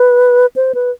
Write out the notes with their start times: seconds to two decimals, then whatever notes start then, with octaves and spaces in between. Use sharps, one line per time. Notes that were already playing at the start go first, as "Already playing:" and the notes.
Already playing: B4
0.56 C5
0.75 B4